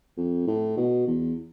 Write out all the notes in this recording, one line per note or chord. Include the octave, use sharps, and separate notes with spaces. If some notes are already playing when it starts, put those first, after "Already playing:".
F2
A2
B2
E2